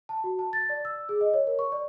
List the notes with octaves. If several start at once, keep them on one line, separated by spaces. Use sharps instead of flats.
A5
F#4
A5
A6
D5
E6
G#4
D#5
C#5
A#4
C#6
D5